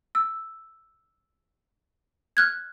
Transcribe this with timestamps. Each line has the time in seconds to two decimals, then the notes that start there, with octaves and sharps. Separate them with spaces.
0.15 E6
2.37 F6 F#6 G#6